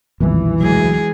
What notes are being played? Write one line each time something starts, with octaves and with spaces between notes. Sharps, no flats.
B1 F2 A#2 D#3 E3 G3
D2 F#3 G#3 G#4